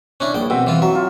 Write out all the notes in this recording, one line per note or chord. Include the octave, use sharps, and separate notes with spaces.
C#4 D4 E4
A#1 G5
B2 C4 E5 G5
E3 F4
F#3 E5
F4